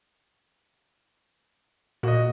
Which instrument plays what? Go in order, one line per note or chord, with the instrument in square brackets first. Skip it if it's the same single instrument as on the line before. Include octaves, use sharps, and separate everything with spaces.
[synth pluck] A#2 [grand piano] F#4 D#5